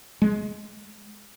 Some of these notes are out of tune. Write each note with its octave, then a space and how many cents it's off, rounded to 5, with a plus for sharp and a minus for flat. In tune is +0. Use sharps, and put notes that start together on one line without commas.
G#3 +10